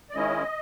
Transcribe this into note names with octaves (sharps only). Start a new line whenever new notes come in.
D5
D#3 G#3 C#4 E4 D#5